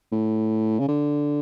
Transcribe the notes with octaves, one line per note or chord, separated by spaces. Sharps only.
A2
C#3
D3